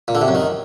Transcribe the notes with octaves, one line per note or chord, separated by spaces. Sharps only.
A#2
D3
C3
F#2
D#3